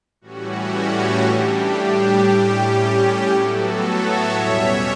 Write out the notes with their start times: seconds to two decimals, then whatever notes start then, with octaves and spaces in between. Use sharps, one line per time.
0.21 A2 E3 G3 C#4 F#4
1.24 A2 G3 D4 G4
1.76 G4
2.27 A2 G3 C#4
2.79 G4
3.29 A2 F#3 B3 F#4 A4
3.81 C#5 E5
4.33 E2 B2 G3 C#4